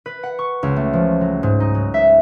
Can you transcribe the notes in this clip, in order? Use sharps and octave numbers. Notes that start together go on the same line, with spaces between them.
B4
F#5
C#6
C#2
A3
F3
F#3
G#2
D#4
F#3
E5